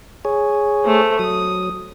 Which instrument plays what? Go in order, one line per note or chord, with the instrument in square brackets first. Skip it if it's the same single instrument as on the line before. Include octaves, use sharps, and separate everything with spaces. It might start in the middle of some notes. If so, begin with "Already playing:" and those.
[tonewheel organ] G#4 C#5
[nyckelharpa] A3 C5
[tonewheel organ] F#3 [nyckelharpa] D#6